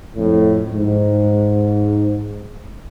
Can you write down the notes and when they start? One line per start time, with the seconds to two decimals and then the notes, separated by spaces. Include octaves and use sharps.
0.17 F2 A2
0.71 G#2